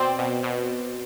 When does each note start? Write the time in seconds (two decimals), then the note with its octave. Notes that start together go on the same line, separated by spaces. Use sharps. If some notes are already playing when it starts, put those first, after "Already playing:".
Already playing: B2 C4 C5 D5
0.19 B2
0.43 B2